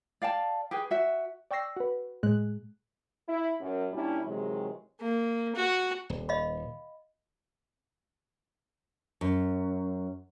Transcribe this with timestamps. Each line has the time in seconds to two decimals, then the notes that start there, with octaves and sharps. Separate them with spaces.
0.22 D5 F5 G5 A5
0.71 G4 G#4 B4 G5
0.91 F#4 E5
1.51 D5 G5 C#6 E6 A#6 C7
1.76 F#4 B4
2.23 A2 G#3 F#6
3.28 E4
3.61 F#2
3.92 A#2 G3 C#4 D4 E4
4.25 C3 D#3 E3 F#3 G#3
5.01 A#3
5.55 F#4
6.10 D#1
6.29 D#5 F5 B5
9.21 F#2